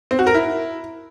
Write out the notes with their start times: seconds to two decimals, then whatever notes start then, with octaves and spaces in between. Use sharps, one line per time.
0.11 C4
0.19 F#4
0.27 A#4
0.34 E4